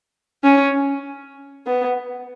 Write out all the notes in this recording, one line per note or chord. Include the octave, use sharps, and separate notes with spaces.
C#4
B3